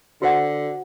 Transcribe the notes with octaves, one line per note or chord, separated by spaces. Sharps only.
D3 F#4 C5 F#5